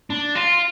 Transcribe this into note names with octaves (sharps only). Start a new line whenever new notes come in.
D4
F4